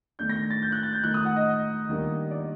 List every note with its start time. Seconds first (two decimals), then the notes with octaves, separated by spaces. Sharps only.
0.19 D#3 A3 D4 G6
0.29 A#6
0.50 A6
0.62 G6
0.72 F#6
0.83 A6
0.93 G6
1.03 D#3 A3 D#4 F#6
1.14 D#6
1.25 F#5
1.36 D#5
1.89 D#3 G3 A#3 D4
2.31 D5